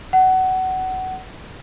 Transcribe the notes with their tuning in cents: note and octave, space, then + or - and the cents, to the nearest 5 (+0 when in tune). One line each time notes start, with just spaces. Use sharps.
F#5 +20